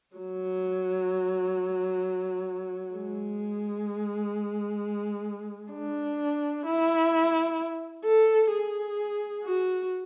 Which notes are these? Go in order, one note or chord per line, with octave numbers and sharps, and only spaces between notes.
F#3
G#3
D4
E4
A4
G#4
F#4